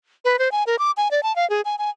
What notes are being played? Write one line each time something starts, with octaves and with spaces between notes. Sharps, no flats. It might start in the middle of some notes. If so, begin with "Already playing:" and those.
B4
C5
G#5
A#4
D6
G#5
D5
A5
F5
G#4
G#5
G#5